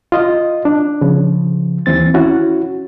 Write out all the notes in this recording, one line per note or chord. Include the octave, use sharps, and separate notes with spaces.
F4 D#5
D4
C#3 F3
D#2 E3 C4 A6
C#4 E4 F#4